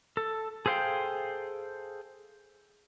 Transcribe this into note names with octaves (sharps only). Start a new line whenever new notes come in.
A4
G#4 A4 C5 F5 G5